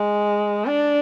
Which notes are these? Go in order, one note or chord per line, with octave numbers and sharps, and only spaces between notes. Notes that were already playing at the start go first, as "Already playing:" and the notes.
Already playing: G#3
D4